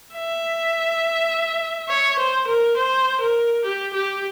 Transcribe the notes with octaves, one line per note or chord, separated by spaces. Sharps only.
E5
C#5
C5
A#4
C5
A#4
G4
G4